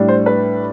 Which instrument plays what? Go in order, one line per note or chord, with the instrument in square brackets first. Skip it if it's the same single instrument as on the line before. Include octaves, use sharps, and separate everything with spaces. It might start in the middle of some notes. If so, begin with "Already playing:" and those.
Already playing: [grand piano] A2 G3 D4
C5
B4